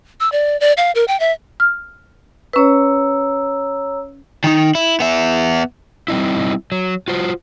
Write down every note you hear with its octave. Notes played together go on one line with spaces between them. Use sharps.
E6
D5
D5
F5
A#4
G5
E5
F6
C#4 B4 C#5 A#5 E6
D#3 D#4
E4
B3 E5
G3 C4 D#4 E4
F#3
F4 F#4 C5